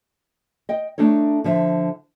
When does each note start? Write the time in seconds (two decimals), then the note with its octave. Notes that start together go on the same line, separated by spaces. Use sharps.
0.69 D#5 G5
0.98 A3 D4 D#4 A4 C#5
1.44 D3 F3 E5